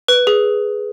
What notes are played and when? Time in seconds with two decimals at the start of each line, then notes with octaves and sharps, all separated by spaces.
0.08 B4
0.27 G#4